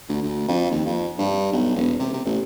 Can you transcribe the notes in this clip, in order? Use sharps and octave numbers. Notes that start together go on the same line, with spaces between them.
D2
D2
F2
D#2
F2
G2
B1
E1
C3
C3
A1